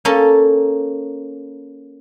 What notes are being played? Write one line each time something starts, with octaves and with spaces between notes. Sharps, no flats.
A#3 C#4 A4